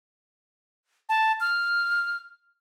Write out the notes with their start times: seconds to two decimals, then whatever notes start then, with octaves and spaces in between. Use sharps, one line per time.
1.09 A5
1.40 F6